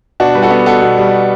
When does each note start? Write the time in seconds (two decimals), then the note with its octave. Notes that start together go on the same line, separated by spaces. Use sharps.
0.20 B2 D4 F#4
0.35 G3 B4
0.43 F#4 A4
0.51 B3
0.66 B2 F#4 A4
0.82 B2
0.98 G3